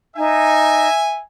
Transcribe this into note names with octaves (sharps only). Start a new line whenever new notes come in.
D#4 E5 G#5